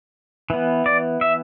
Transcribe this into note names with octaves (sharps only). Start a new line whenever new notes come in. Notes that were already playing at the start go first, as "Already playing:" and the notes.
E3 B3
D5
E5